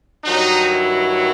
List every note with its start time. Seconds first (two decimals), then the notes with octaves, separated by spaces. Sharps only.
0.24 G2 D#3 F#3 D#4
0.70 E4